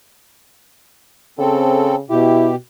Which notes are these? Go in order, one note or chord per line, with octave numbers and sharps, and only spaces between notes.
C#3 C4 A4
B2 E4 G4